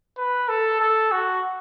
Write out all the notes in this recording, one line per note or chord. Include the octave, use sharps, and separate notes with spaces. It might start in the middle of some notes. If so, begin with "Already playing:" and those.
B4
A4
A4
F#4